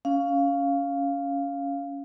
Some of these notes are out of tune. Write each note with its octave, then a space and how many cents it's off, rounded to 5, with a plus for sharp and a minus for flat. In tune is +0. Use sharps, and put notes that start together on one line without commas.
C#4 +15 F5 +0